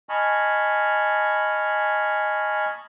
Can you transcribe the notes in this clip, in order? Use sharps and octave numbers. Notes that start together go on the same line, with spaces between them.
D#5 G#5 A5 B5 C#6 F6